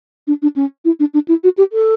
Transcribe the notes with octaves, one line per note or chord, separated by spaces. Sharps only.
D4
D4
C#4
E4
D4
D4
E4
F#4
G4
A4